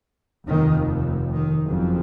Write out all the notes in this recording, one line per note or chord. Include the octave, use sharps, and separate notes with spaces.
F1 D#2 D#3
D#3
F#1 F2